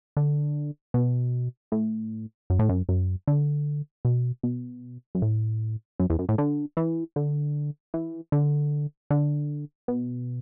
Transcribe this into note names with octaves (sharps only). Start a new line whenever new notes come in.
D3
B2
A2
F#2
A2
F#2
F#2
D3
B2
B2
F#2
A2
F#2
E2
F#2
A2
D3
E3
D3
E3
D3
D3
B2